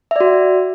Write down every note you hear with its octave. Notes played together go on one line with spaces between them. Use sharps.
F#4 D5 E5